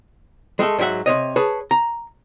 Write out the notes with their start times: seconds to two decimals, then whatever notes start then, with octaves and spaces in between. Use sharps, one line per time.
0.59 G#3 A3 F#4 A4
0.78 G#2 F#3 E4 E5 F#5
1.06 C3 C#5 D#5
1.36 G#4 B4 C#5 A5
1.71 A#5